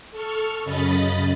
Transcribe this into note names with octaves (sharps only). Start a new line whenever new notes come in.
A4 C#6 F6
F#2 C#3 D#5 B5 A6